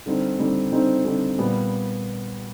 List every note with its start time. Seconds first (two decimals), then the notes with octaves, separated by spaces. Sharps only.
0.06 D3 G3 C4 D#4
0.39 D3 G3 C4 D#4
0.72 D3 G3 C4 D#4
1.05 D3 G3 C4 D#4
1.38 A#2 G3 B3